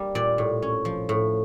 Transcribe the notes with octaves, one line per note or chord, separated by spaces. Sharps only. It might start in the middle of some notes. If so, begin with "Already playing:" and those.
Already playing: G3 A#3
A#2 D5
A2
C#4
F3
A2